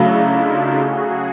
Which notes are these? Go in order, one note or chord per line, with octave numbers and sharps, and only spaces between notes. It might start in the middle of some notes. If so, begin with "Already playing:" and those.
Already playing: C#3 F#3 A3 D4 E4
D#4 F4
F#4 G#4